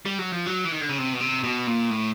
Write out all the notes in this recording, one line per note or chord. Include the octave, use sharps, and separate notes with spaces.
G3
F#3
F3
F#3
E3
D#3
D3
C#3
C3
B2
C3
B2
A#2
A2